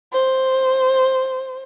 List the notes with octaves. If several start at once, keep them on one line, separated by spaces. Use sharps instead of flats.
C5